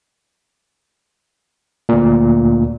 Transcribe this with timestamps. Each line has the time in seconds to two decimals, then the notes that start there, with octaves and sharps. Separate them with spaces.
1.89 D2 A#2